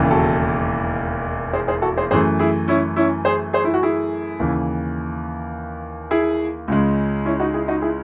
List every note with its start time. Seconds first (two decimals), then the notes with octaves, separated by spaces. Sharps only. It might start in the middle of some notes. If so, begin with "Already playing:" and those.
Already playing: E1 D#2 C#3 E3
0.11 F#4 A4
1.53 G#4 C5
1.68 G#4 C5
1.82 F#4 A4
1.97 G#4 C5
2.11 F#2 E3 A3 G#4 C5
2.39 E4 G#4
2.68 C#4 E4
2.96 C#4 E4
3.25 G#4 C5
3.53 G#4 C5
3.65 E4
3.74 F#4
3.83 E4 G#4
4.40 D#2 C#3 E3
6.11 E4 G#4
6.68 C#2 C#3 G#3
7.25 C#4 E4
7.40 D#4 F#4
7.54 E4 G#4
7.68 D#4 F#4
7.82 E4 G#4